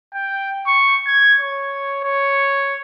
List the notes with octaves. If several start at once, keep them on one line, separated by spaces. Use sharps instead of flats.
G5
C#6
G#6
C#5
C#5